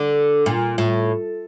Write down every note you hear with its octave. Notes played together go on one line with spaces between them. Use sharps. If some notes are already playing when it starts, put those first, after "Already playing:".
Already playing: D3
A#2
A2